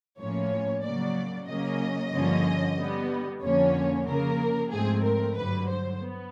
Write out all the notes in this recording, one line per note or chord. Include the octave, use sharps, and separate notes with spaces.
A2 F3 A#3 C#4 C#5
C#3 F#3 A#3 D5
C#3 F#3 A#3 C#4 D#5
G2 D3 F3 A#3 C#4
D3 G3 B3
F2 D3 F3 A#3 C#4 C#5
C#3 F3 A#3 A#4
G#2 F3 A3 C4 G#4
A#4
G2 D3 F#3 B4
C5
B3